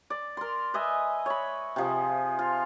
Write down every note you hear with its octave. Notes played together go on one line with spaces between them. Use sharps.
D5
A#4 C6
B4 D#5 E5 G#5
C#5 B5
C3 F3 G#4
F4